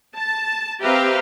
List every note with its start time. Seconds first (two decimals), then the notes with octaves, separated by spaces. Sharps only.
0.15 A5
0.82 C4 G4 B4 E5 F5 A#5